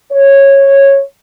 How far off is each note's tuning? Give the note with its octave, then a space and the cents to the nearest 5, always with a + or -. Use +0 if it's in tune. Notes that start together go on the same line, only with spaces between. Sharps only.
C#5 -10